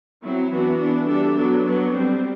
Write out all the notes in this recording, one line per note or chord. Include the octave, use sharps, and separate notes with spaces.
F#3 C4 E4
E3 B3 D4 F#4
E3 B3 D4
E3 G3 D4 A4
F#3 B3 D4
F#3 B3 D4
G3 C4